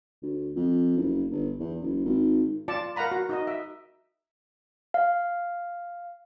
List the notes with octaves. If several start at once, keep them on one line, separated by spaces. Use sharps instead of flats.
D2
F2
F#1
G1
E2
F#1
G#1
F4 D5 A5
A#4 F5 F#5 A#5 B5
F#4
D#4 F#4 D#5
E5
F5